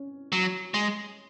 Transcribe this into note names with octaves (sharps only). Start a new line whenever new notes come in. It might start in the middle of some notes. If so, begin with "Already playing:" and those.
Already playing: C#4
F#3
G#3